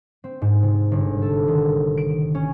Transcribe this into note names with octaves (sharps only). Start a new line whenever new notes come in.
C4
G#2
C3
G1
A4
D#3
D7
C#4